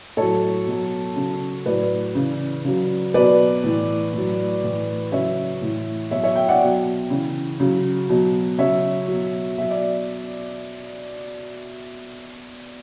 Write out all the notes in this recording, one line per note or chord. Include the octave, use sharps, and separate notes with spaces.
A2 F#3 A4 C#5
B2 F#3
C#3 F#3
A2 F#3 B4 D5
C#3 E3
C#3 F#3
B2 F#3 B4 D5
A2 E3
A2 F#3
A2 E3
C#3 F#3 C#5 E5
A2 E3
B2 F#3 C#5 E5
C#5 E5
E5 G5
D5 F#5
B2 F#3
C#3 E3
C#3 F#3
B2 F#3
C#3 F#3 C#5 E5
B2 F#3
B2 F#3 E5
D5